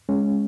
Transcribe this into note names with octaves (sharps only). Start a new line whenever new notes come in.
G#3 C#4